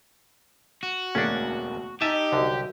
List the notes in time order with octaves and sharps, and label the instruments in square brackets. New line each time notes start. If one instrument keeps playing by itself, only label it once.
[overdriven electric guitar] F#4
[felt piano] E1 D2 A#3 [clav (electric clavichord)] C#4 D4
[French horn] D#4 [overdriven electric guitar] G4 [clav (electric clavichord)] E5 G#5 A5 [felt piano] E6
[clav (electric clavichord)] C2 D3 [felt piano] F#3 D#5